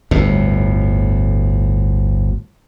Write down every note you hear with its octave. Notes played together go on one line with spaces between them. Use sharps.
G1 D2 A2